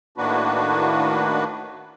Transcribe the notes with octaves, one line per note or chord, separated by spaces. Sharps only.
A2 D#3 A#3 D4 F#4 B4